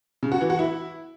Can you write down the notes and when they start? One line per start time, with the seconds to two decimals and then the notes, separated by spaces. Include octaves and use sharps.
0.23 C#3
0.32 F#4
0.41 E3
0.50 F#4
0.59 E4